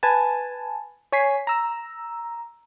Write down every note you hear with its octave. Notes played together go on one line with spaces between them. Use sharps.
B4 G#5 A5
C#5 G#5 B6 C7
A#5 E6